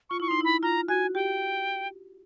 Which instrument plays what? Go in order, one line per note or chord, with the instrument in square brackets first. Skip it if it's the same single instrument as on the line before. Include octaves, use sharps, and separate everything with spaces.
[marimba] F4 [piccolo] C#6
[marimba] E4 [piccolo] C#6
[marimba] D#4 [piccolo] C6
[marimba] E4 [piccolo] B5
[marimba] F4 [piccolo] A#5
[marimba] F#4 [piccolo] G#5
[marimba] G4 [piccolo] G5